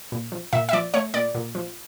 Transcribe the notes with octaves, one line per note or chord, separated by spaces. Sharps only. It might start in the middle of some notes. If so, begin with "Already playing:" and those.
A#2
F3
A#2 E5
E5
F3 D5
A3 C#5
A#2 D5
A#2
F3